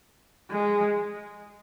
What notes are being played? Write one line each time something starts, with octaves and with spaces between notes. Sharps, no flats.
G#3